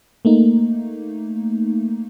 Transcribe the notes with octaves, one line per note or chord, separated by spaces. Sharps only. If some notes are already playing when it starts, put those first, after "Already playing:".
A3 A#3 D#4